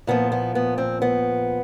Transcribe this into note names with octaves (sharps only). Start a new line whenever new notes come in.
A#2 F3 B3
B3
B3
C4
B3